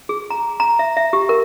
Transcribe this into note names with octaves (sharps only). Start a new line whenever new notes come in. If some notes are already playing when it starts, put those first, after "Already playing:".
G#4
A#5
A#5
E5
E5
G4
A#4